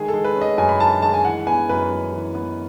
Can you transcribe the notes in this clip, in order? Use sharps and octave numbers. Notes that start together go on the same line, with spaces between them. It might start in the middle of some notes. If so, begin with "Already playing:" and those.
Already playing: D#3 G#3 G#4
A4
G#3
B4
C#4
D#5
F#2 G#5
B5
D#3 A5
G#3 A5
G#5
E3 F#5
B3 G#5
F#2 B4
F#2
E3
B3